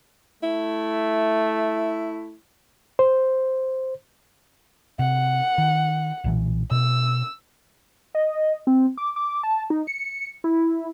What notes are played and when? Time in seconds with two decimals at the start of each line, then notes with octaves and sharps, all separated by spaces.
0.43 A3 E4
2.99 C5
4.99 C3 F#5
5.58 D#3
6.24 B1 A#2 E3
6.71 B2 E6
8.15 D#5
8.67 C4
8.98 D6
9.16 D6
9.43 A5
9.70 D#4
9.87 C#7
10.44 E4